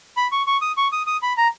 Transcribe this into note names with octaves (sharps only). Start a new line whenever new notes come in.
B5
C#6
C#6
D#6
C#6
D#6
D#6
B5
A#5